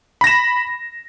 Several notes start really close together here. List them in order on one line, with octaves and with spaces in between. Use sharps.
B5 A#6 E7